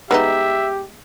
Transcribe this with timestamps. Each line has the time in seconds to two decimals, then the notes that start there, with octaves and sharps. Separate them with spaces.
0.11 G#3 B3 D#4 G4 E5